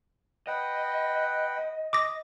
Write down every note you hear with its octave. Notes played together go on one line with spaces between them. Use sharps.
B4 D#5 F#5 G5
D6 D#6 A#6